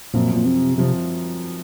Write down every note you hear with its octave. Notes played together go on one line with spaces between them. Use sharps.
F#2 A#2 F3 C4
A#2
C3
C3 F3 C4